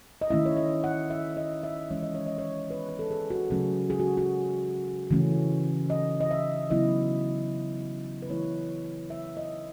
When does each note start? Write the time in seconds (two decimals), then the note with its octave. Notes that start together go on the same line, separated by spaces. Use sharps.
0.21 D#5
0.30 D#3 A3 C#4 E4 E5
0.46 C#5
0.57 D#5
0.84 F#5
1.10 E5
1.37 D#5
1.63 E5
1.91 E3 G#3 C#4 C#5
2.03 D#5
2.15 C#5
2.26 D#5
2.38 C#5
2.70 B4
2.89 B4
2.99 A4
3.11 G#4
3.30 F#4
3.50 C#3 F#3 A3 C#4 G#4
3.90 G#4
4.00 F#4
4.17 F#4
5.11 C#3 E3 A3 C#4
5.90 D#5
6.21 D#5
6.31 E5
6.70 C#3 F#3 B3 E4 D#5
8.22 B4
8.30 E3 A3 E4 C#5
9.10 E5
9.37 D#5